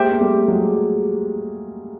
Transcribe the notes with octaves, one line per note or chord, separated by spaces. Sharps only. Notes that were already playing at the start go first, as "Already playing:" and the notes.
Already playing: G#3 A#3 G4 C5 E5 G5
A#3
G3 A3
F#3 G#3